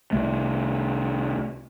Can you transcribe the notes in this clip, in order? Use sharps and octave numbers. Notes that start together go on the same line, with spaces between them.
C2 A3